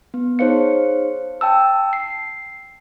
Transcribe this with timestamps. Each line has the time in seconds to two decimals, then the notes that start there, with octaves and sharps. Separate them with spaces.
0.14 B3
0.39 D#4 G#4 C5 C#5 F5 C#7
1.41 G5 A5 E6
1.93 C7